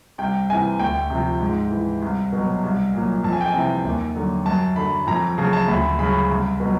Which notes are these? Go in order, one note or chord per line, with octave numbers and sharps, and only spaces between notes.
C2 G5
C3 E3 G#5
D2 G5
C3 F3
G#2
E3
C2
B2 F#3
C2
A#2 F#3
F2 A5
G#5
G5
G#5
C3 E3
D#2
D3 F#3
F#2 A5
D3 F#3 B5
F2 A#5
C#3 F#3 A5
A5
D2 B5
C#3 F#3 B5
C2
B2 F#3